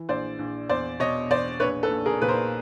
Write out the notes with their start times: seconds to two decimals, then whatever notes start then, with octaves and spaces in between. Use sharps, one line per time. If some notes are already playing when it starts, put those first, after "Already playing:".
Already playing: E3
0.09 A#1 C5 D5
0.39 A#1
0.69 E2 C5 D5
1.00 B2 C#5 D#5
1.30 E2 C5 D5
1.60 A#1 B4 C#5
1.83 A4 B4
1.91 A#1
2.06 G#4 A#4
2.21 A#2 B4
2.29 A#4 C5